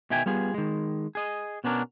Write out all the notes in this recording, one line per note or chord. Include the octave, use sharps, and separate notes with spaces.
B2 D#3 E5 G5 G#5
G3 B3 F4 G#4
D#3 G#3
G#4 D#5
B2 B3 C#4 D4 A#4